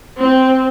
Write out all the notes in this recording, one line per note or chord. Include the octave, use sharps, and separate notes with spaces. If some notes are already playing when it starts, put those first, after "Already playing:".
C4